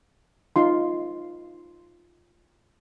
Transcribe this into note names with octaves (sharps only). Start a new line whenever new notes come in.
D#4 F4 C6